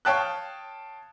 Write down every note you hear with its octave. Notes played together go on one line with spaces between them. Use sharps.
C#5 F5 G5 A5 D#6 F#6